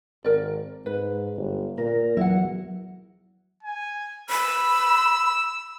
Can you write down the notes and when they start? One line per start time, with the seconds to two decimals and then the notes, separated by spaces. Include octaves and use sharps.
0.24 G#1 A#4 D5
0.86 G#2 B4
1.37 G1
1.78 A#2 A#4
2.17 E2 F#3 E4 F#5
3.63 G#5
4.30 B5 E6